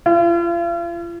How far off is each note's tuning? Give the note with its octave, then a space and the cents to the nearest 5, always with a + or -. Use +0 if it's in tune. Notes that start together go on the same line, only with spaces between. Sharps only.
F4 -40